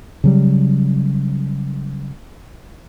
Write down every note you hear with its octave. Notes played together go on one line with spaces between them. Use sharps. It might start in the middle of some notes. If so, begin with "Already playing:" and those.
C#3 F#3 G3